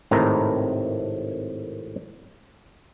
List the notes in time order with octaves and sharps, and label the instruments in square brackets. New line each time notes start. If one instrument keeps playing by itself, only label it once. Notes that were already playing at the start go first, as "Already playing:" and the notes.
[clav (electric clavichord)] G#1 A2 C3 D#3 A#5